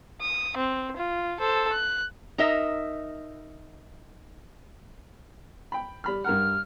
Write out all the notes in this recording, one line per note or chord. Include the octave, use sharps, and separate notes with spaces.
D#6
C4
F4
A4 C5
F#6
D#4 A#4 D#5 E5
G5 B5
G3 B5 F6
G2 A#4 F#5 F6